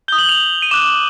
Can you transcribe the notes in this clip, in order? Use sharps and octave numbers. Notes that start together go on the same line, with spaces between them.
D#6 G6 G7
F#7
F7
D#7
D6 F#6 E7